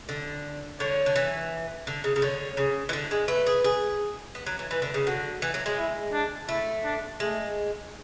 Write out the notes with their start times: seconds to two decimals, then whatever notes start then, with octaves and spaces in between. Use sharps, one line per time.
0.09 D3
0.80 D3 C#5
1.06 D3
1.16 E3
1.87 D3
2.04 C#3
2.16 C#3
2.22 D3 C#5
2.57 C#3
2.89 E3
2.93 D3
3.11 G#3
3.28 A3 B4
3.47 G#4
3.64 G#4
4.35 B3
4.46 F#3
4.59 E3
4.71 E3 B4
4.82 D3
4.94 C#3
5.06 D3 F#4
5.42 E3
5.54 F#3
5.66 G#3
5.77 E4
6.13 D4
6.48 A3 E4
6.84 D4
7.20 G#3 A3